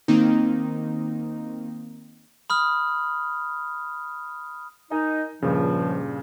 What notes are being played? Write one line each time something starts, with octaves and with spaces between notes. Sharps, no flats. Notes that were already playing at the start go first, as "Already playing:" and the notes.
D#3 A#3 C4 D#4
B5 D#6 F6
D#4 A#4 D#5 G#5
C#2 G2 A#2 C#3 F3